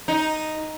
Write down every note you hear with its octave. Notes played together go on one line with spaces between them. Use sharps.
D#4